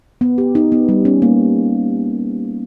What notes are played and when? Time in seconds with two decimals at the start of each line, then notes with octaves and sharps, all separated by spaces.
0.21 B3
0.38 G4
0.55 D#4
0.72 B3
0.89 G3
1.05 C#4
1.22 A#3